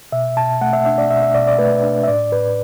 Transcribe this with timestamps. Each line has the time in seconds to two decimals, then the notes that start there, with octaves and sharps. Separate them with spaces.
0.12 B2 E5
0.36 B2 A5
0.61 A3 F#5
0.73 E5
0.85 D4 E5
0.98 D5
1.10 B2 E5
1.23 E5
1.35 B2 D5
1.47 D5
1.59 A3 B4
1.83 D4
2.03 E5
2.08 A2 D5
2.32 A2 B4